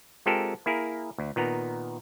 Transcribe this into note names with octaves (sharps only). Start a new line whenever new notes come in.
G#3 C4 F4 G4 A4 A#4
A#3 E4 G#4 A#4
D2
A#2 D#3 B3 A#5